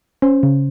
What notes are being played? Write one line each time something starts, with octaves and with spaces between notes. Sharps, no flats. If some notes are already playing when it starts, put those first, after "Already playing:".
C#4 C5
C#3